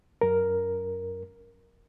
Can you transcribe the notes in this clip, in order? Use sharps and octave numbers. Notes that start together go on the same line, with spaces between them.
F#2 A#4